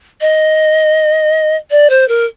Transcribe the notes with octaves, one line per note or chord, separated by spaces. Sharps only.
D#5
D5
C5
A#4